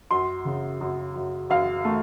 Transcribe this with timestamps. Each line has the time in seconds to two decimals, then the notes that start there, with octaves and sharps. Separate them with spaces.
0.11 F#2 C6
0.45 C#3
0.81 F#2
1.16 F#2
1.50 F#2 F5
1.85 A3